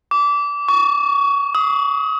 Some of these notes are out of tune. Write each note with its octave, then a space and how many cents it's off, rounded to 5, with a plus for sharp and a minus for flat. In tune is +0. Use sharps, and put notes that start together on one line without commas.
D6 -25
C#6 +25
D#6 +30